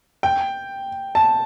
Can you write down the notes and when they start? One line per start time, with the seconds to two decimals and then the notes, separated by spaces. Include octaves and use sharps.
0.23 G5
1.15 A5